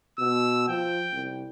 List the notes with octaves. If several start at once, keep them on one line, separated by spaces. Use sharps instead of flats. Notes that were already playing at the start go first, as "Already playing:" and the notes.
B2 E6
F3 G5
C2